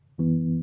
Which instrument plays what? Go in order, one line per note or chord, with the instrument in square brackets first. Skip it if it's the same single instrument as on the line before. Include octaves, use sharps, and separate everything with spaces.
[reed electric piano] F#2 E3 B3